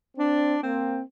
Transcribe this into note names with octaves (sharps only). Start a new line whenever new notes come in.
C4 D4
A#3 C4